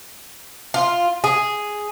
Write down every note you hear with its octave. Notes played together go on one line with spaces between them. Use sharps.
F4
G#4